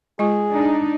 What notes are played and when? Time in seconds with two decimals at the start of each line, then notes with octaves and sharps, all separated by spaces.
0.19 G#3 F4 G#4
0.51 D4 D#4